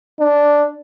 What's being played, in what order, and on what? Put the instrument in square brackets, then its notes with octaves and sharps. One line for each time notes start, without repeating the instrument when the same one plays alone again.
[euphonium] D4